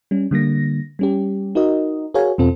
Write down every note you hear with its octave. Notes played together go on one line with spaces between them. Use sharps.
G3 C#4
D3 G3 A#3 A#6
G3 C#4 G4
D#4 F#4 A#4 D#5
F#4 G#4 A#4 C#5 F5 G#5
E2 B2 C4 F4 A4